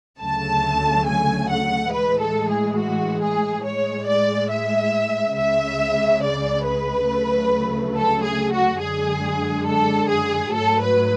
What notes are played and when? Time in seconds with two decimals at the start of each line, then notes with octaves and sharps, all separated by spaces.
0.20 D2 C#3 F#3 A3 A5
1.06 G#5
1.50 F#5
1.92 A2 E3 G#3 B4
2.21 A4
2.49 G#4
2.78 F#4
3.21 G#4
3.64 A2 G#3 C#5
4.08 D5
4.51 E5
5.36 C#2 C#3 G#3 E5
6.23 D5
6.66 B4
7.09 D2 C#3 F#3 A3
7.95 A4
8.23 G#4
8.52 F#4
8.80 F#2 D3 G#3 G#4
9.67 A4
10.09 G#4
10.53 G#2 F#3 A3 A4
10.81 B4